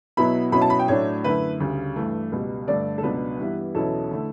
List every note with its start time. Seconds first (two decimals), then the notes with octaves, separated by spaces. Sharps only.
0.17 B2 F#3 B3 E4 B5
0.52 B2 F#3 C#4 E4 B5
0.62 A5
0.70 B5
0.79 G5
0.88 A2 F#3 A3 D4 C#5
1.24 F#2 D3 A3 E4 B4
1.60 D2 C#3 G3
1.96 G2 E3 A3
2.32 C#2 B2 G3
2.67 G2 D3 A3 D4 D5
2.98 A4
3.03 C#2 B2 F#3 B3 D4 B4
3.38 G2 E3 G3 B3 E4
3.75 E2 B2 F#3 C#4 E4 A4
4.11 D3 A3 E4